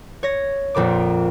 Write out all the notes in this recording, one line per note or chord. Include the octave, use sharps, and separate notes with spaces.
C#5 A#6
A#1 F2 A#2 D6